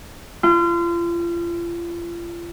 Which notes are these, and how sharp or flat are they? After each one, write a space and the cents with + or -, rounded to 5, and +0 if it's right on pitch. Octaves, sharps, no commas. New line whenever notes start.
F4 -35